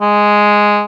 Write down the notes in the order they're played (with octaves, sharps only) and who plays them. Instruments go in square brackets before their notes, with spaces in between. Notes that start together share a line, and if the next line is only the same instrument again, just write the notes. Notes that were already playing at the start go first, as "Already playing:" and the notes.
[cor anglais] G#3